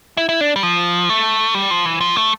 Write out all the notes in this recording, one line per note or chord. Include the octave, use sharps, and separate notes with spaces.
E4
E4
D4
G3
F3
A3
G3
F3
E3
F3
A3